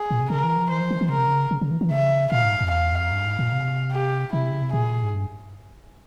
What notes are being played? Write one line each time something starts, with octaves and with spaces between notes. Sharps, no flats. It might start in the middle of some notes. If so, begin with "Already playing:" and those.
Already playing: G#4
A#2
C3
C#3 A#4
E3
F3
E3 C5
F3
E3
E3
C#3 A#4
C3
C#3
C#3
C#3
E3
E3
C#3 E5
A#2 F5
G#2
F2
E2 F5
F2
G2
G#2
A#2
C3
G4
C3 E4
C#3
C3
A#2 G#4
G#2
G2